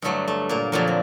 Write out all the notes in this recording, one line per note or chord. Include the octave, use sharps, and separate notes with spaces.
G2 D3 F#3 A3
A3
A#2 A#3
F2 A#2 D3 F#3 A#3
C4